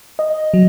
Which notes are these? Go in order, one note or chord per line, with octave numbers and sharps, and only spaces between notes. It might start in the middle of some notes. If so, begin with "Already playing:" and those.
D#5
F#3